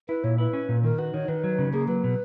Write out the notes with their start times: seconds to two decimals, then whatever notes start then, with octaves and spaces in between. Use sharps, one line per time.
0.09 E4 B4
0.24 A#2 C#5
0.38 E4 B4
0.53 C#4
0.69 A#2
0.83 D#3 A#4
0.98 F#4 B4
1.14 D#3 C#5
1.28 D#3 B4
1.44 F#3
1.59 C#3
1.73 A#3 G#4
1.88 F#3 B4
2.04 B2